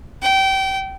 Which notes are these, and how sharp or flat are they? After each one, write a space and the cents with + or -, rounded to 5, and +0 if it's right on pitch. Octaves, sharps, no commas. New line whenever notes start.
G5 -25